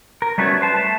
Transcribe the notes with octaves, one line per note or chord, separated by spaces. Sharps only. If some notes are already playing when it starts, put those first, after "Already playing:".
A#4
G3 A3 B3 C#4 F#4 C#5
B4 C5 A5
A3 A5